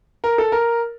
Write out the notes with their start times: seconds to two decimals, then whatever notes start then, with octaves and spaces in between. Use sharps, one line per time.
0.24 A#4
0.38 A4
0.52 A#4